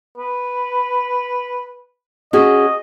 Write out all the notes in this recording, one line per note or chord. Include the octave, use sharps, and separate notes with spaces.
B4
C#4 F#4 G#4 D#5